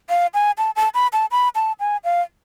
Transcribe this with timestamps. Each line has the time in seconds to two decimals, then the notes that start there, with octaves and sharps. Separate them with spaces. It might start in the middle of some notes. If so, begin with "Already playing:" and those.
0.10 F5
0.34 G#5
0.58 A5
0.76 A5
0.94 B5
1.13 A5
1.32 B5
1.55 A5
1.80 G#5
2.04 F5